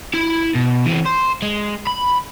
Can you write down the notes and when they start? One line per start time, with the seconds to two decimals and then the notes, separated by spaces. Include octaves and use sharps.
0.14 E4 B5
0.55 B2
0.86 E3 C4
1.06 C5
1.42 G#3
1.87 B5